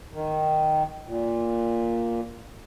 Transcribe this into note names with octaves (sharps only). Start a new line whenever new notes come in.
D#3
A#2